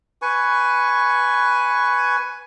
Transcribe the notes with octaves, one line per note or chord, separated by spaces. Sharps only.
B4 G#5 C#6